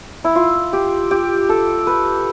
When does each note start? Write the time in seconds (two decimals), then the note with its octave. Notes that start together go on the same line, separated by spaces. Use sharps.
0.24 E4
0.35 F4
0.73 G4
1.11 G4
1.49 A4
1.87 B4